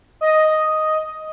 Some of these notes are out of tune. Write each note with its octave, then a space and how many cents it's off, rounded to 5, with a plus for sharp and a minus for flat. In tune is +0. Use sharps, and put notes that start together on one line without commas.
D#5 +0